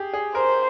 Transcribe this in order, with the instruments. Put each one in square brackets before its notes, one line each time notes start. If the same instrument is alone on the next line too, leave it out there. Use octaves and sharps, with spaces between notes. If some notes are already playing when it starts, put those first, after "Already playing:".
Already playing: [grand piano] G4 G#4
G#4
[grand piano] A#4 [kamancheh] C5